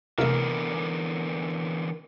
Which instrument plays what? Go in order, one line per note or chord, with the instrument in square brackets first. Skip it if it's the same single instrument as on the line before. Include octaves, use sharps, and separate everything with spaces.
[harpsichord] C2 A3 [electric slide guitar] D3 E3 B3 [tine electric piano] A#4